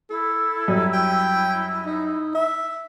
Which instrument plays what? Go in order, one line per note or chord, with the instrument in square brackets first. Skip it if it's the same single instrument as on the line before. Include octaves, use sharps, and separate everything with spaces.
[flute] E4 [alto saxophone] A4
[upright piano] F#2 F#3 G3
[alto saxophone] G5
D#4
E5